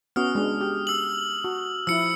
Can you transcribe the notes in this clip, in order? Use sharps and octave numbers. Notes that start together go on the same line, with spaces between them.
B3 C#4 F#4 D#6 F6
G#3 D4
G4
E6 F#7
F#4
F3 E4 E6 C#7